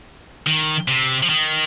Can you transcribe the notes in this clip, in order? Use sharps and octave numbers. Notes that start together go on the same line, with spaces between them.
D#3
C3
F3
D#3